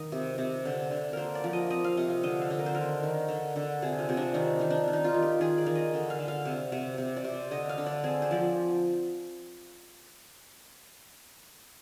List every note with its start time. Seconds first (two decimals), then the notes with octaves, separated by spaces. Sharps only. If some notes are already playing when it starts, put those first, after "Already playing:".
Already playing: D#3 D#5 F5
0.12 C3
0.38 C3
0.65 D3
0.91 D3
1.13 A#3 A#4 C5
1.35 D5
1.44 F3
1.53 D#5
1.70 C4 D#5
1.84 F5
1.97 C3 D#5
2.10 F5
2.23 D3 D#5
2.42 F5
2.50 D3
2.59 A#4
2.66 C5
2.75 D#3 A#4
3.03 D#3
3.28 D3
3.56 D3
3.82 C3 G#4
3.99 F4
4.09 C3
4.17 D4
4.34 D#3 D4
4.59 D#3 D#4
4.70 D4
4.88 D#3
4.93 D#4
5.04 F4
5.14 D#3
5.22 G4
5.41 D#3 G#4
5.58 D5
5.67 D#3
5.75 D#5
5.94 D3
6.10 F5
6.19 D3
6.28 F5
6.45 C3
6.72 C3
6.98 C3
7.17 D5
7.24 C3
7.34 C5
7.51 D3 D#5
7.69 F5
7.78 D3
7.86 D5
8.04 C4 G#4
8.22 C5
8.31 F3 D5